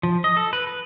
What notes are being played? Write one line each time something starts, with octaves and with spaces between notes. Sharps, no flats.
F3
D#5
A4
B4
B4